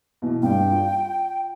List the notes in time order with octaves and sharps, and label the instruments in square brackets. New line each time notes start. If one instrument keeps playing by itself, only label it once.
[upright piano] B2 E3
[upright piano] G2 G3 [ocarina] G5
[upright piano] F4